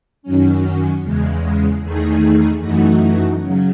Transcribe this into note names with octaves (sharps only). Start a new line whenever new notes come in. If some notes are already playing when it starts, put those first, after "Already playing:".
F#2 D#3 F#3 C#4
E2 C#3 G#3
E2 D#3 A3 D#4 G#4
F#2 E3 A3 D#4 F#4
C#3 F#3